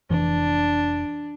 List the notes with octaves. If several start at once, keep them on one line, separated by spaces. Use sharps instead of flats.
F1 E3 D4